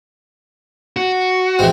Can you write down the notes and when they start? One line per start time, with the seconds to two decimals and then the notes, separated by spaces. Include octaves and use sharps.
0.97 F#4
1.59 E3 G#3 C4